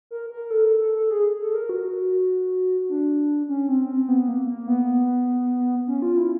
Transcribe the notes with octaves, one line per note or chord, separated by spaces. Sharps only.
A#4
A#4
A4
A4
A4
A4
G#4
A4
A#4
F#4
D4
C#4
C4
C4
B3
A#3
A#3
B3
C#4
F4
E4